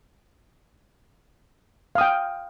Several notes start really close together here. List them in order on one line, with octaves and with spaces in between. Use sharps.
F5 D#6 G5